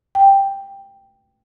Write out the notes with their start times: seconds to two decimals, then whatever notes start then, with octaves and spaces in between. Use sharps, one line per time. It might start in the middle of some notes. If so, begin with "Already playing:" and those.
0.15 G5